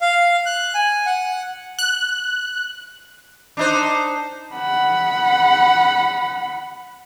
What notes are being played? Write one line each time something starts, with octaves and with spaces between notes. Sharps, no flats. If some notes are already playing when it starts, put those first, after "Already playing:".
F5
F#6
G#5
F#5
F#6
D4 D#4 C5
F#5 B5